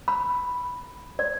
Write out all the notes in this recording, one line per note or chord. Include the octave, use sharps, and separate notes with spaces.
B5
D5